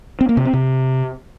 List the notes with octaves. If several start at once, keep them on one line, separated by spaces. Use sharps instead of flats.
C4
A#3
C3
C4
C3